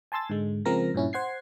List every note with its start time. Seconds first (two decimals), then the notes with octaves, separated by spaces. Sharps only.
0.12 G#5 A5 C6 E6 A6
0.29 G#2 D3 G#3
0.65 C#3 F3 G#3 C4 A#4 A#6
0.94 G2 A#2 C#4 E4
1.13 C5 F#5 G#6 C7